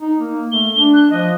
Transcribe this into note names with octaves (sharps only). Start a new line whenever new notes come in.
D#4
A#3
A3 G7
D4
F#6
F3 D#5